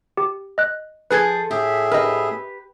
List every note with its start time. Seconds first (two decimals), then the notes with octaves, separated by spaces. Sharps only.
0.17 G4
0.58 D#5 F#6
1.11 F3 G#4 A4 B4 G#6
1.51 A2 G4 G#4 E5
1.92 G4 A#4 B4 D#5